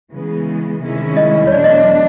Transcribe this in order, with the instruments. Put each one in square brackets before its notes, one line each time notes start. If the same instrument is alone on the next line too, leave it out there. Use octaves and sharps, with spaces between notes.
[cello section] C#3 E3 G#3 B3
C3 D#3 G#3 C#4 E4
[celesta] D#5
C#5
[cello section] E2 B2 F#3 A3 D4 [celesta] D5
[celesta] D#5
D#5